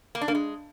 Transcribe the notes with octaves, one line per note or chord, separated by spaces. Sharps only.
A#3
D4
A#3
G#3